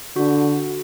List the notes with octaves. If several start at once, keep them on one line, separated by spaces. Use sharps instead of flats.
D3 F#4